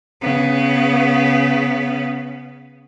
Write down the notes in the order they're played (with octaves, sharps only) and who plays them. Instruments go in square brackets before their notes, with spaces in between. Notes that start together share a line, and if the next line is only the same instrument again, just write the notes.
[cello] C#3 B3